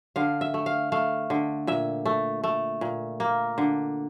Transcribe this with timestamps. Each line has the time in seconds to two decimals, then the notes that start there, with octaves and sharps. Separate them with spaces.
0.16 D3 F5
0.41 E5
0.54 A3
0.66 F5
0.92 A3 F5
1.30 D3
1.67 A#2 E5
2.06 A3
2.44 A3
2.81 A#2
3.20 A#3
3.58 D3